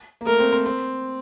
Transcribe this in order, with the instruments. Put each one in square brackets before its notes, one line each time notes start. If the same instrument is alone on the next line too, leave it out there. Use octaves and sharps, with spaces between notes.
[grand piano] A#3
[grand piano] A3 [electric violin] A#4
[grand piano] C4
C4
C4